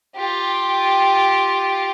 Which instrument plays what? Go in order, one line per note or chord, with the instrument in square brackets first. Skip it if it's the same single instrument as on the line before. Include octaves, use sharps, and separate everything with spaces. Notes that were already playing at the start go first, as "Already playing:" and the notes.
[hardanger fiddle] F4 G4